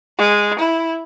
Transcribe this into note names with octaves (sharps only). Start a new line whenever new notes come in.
G#3
E4